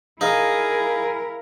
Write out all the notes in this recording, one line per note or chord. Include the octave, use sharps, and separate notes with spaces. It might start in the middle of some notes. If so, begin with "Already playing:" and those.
D#4 E4 G#4 A#4 F5